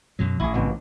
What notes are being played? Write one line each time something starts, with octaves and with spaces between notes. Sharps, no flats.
F#2 B2 F#3
A1 E4 G#4
G#1 C#2 B2